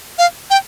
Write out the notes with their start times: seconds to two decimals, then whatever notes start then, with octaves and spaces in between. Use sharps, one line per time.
0.18 F5
0.50 G5